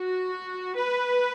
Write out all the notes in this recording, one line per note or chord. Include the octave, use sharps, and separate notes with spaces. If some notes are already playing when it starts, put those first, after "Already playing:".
Already playing: F#4
B4